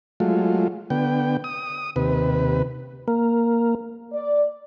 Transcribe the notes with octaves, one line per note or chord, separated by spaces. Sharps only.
F#3 G#3 A3 F4
D3 B3 G5
D#6
D#2 C3 B4
A#3
D5